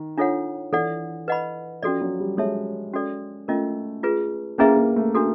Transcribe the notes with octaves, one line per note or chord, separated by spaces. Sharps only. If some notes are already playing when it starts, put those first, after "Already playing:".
Already playing: D#3
D4 F4 A4 C#5 F#5
E3 A4 D5 F#5
B4 D#5 F#5 B5
F3 C#4 F#4 A4 D5
F#3
G3
G#3 A4 C#5 E5 A5
C#4 F#4 A4 D5
A3 C#4 F4 A#4 D#5
F4 G#4 B4
A#3 C#4 E4 G#4 B4 E5
A#3
A3
D4 F#4 A4